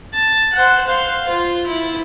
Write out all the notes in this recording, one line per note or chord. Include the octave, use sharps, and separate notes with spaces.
A5
C5 F#5
C5 F5
F4
E4